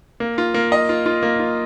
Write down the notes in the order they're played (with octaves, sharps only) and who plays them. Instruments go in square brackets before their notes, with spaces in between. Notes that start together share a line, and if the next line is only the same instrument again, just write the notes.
[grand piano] A#3
F4
A#3
D#5
F4
F4
A#3
F4